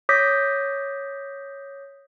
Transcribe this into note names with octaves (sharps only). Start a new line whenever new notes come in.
C#5 D6 D#6 G6 A#6 B6